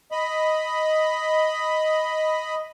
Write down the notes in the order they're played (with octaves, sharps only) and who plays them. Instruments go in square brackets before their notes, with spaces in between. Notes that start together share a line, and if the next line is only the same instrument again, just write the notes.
[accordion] D#5 B5